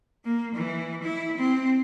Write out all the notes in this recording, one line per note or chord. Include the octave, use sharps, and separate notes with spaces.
A#3
E3
E4
C4